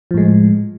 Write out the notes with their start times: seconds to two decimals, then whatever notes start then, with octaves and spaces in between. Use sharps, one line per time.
0.11 F3
0.14 A2
0.17 G#3